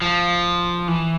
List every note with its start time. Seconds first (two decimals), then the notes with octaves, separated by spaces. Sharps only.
0.02 F3
0.88 E3